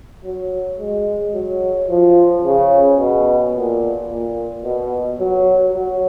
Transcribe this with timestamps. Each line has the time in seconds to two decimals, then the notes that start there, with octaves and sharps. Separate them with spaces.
0.24 F#3
0.79 G#3
1.34 F#3
1.88 F3
2.44 C#3
2.98 B2
3.54 A#2
4.09 A#2
4.63 B2
5.19 F#3
5.73 F#3